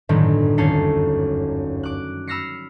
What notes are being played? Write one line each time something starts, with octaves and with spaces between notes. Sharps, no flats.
G1 F#2 A2 D3 D#3
D#2 A3 C#4 A4 C7
D6 F#6
B5 E6 F6 A#6 C7 C#7